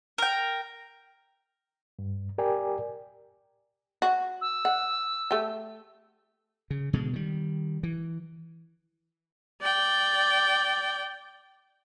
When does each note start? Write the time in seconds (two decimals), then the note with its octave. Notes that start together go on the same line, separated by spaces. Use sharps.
0.18 A#4 G5
1.99 G2
2.38 G4 A#4 D5 G5 G#5
4.02 F#4
4.41 E6
4.65 F#5
5.31 A3 G4
6.70 C#3
6.93 B2 D3 G#3
7.13 D#3 G3
7.83 E3
9.62 D5 G5